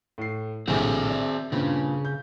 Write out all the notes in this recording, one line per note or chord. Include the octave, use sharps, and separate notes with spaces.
A2 C7
A#1 A2 C3 C4 G#4
D5 E5
G2 A#2 C#3 C4
G6